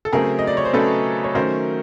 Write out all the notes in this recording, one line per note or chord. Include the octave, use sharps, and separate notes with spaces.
A4
C#3 F#3 A3 C4 G#4 A#4
D#5
D5
C#5
C5
C#3 F#3 A3 C4 A4 B4
C#5
D#3 F#3 A3 C#4 A#4 C5